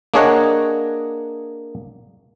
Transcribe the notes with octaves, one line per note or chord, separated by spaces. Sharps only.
A#3 D4 G#4 C#5 D#5 F#5